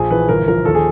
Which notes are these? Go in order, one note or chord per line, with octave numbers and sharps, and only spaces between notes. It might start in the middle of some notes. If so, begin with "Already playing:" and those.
Already playing: A#1 G#4
E3 B4
G1 A#4
F3 A#4
D#2 A4
G#4